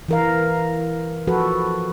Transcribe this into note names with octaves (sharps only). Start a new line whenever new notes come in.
E3 A#4 F5
F3 F#4 A4 B4